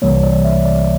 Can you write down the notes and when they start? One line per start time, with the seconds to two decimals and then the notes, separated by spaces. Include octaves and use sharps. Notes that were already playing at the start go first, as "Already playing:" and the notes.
0.02 C2 C3 E3 G3 A#3 C#5
0.23 D5
0.45 E5
0.65 D5